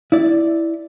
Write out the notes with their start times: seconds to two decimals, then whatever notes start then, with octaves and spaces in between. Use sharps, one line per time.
0.12 E4 D5